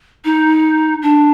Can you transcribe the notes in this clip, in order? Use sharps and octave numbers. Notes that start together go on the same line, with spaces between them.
D#4
D4